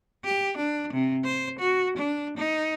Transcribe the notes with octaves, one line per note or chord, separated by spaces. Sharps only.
G4
D4
C3
C5
F#4
D4
D#4